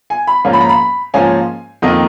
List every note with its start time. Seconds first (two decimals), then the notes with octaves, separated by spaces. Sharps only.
0.10 G#5
0.27 B5
0.45 G#2 F3 A#3 C#4 F4
0.53 B5
0.61 A#5
0.69 B5
1.14 G#2 F3 A#3 C#4 F4 G#5
1.82 F2 D#3 A#3 D#5